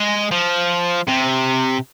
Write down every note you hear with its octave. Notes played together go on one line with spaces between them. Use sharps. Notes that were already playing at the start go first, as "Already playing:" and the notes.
Already playing: G#3
F3
C3